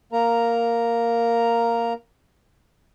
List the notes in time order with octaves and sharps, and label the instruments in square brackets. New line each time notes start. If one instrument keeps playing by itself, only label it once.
[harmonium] A#3 A#4 A#5